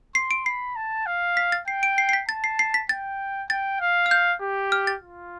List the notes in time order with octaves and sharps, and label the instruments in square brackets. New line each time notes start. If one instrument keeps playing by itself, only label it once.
[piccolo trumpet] C6 [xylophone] C7
[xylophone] D7
[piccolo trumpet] B5 [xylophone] C7
[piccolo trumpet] A5
F5
[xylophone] B6
A6
[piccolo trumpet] G5 [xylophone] C7
[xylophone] D7
C7
C7
B6
[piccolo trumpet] A5 [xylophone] A6
[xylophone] C7
C7
B6
[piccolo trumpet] G5 [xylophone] A6
[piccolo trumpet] G5 [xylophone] A6
[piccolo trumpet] F5
[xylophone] F6
G6
[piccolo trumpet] G4
[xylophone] F6
A6
[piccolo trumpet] F4